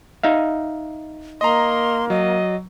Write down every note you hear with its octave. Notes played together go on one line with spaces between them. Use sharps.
D#4 E5 F5
A#3 D#5 A#5 C6
F#3 D#5